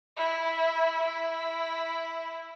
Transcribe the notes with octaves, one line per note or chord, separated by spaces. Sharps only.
E4
E4